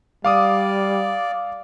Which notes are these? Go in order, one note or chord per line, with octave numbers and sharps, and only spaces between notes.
G3 D5 F5 D6 D#6